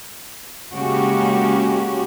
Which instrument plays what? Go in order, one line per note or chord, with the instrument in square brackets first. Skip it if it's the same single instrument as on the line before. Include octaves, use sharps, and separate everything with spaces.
[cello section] C#3 G#3 A#3 C#4 F#4 G4